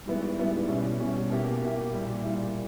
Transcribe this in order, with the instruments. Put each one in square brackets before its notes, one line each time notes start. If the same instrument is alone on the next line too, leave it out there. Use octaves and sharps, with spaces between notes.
[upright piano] G#2 E3 G3 B3 E4
G#2 E3 G3 B3 E4
B2 G3 C#4 E4
B2 G3 C#4 E4
B2 A#3 E4 G4
B2 A#3 E4 G4
A#2 G3 A#3 E4
A#2 G3 A#3 E4